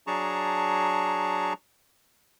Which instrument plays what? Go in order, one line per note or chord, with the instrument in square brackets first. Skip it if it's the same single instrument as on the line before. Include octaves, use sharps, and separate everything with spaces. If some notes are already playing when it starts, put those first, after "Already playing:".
[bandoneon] F#3 D4 G#4 A5 A#5 C#6